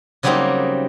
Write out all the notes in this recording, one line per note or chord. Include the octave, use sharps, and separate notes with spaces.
C#3 F#3 G3 A#3 C4 D#4